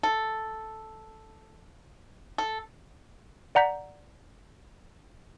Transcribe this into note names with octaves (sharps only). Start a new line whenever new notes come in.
A4
A4
D5 F#5 A#5 G6 B6